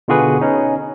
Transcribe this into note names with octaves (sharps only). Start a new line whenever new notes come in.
B2 D3 F4 F#4 G#4 B4
C#4 D#4